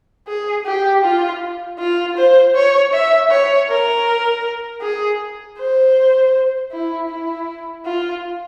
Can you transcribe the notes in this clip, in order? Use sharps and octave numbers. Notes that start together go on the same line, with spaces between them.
G#4
G4
F4
F4
C5
C#5
E5
C#5
A#4
G#4
C5
E4
E4
F4